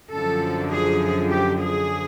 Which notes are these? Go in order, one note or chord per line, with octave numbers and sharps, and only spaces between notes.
F#2 D3 F3 A4
G#4
G4
G#4